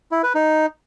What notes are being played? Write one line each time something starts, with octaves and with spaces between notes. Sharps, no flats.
E4
B4
D#4